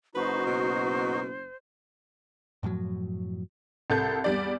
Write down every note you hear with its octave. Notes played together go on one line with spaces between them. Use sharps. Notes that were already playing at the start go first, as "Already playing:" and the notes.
F#1 D#4 F#4 B4 C5
B2
F#2 A2 F3 F#3
C2 A4 G6
E2 G3 D5